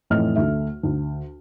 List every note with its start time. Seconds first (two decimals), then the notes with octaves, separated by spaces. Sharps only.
0.10 F2 A2 E3 A3 D#5 F6
0.36 D2 A3 E5
0.83 D2